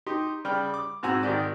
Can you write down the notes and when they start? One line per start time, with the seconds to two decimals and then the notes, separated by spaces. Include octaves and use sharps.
0.06 D#4 G4 C6
0.45 C#3 G3 G5 F6
0.74 D6
1.03 G#2 C4 F#4 G#5 A#5 E6
1.23 G#1 D#3 G4 D5